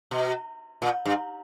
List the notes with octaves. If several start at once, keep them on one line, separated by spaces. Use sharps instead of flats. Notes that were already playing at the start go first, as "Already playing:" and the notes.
B2
A#2
G2